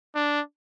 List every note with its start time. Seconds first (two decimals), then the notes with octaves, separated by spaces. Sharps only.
0.15 D4